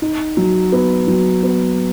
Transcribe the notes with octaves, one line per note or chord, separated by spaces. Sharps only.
D#4
F#3
B3
F#3
B3